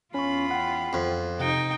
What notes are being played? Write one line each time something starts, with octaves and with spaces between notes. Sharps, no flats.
E2 C#4 F4 B5 C#6
F#5 G5
F2
C3 D#4 G5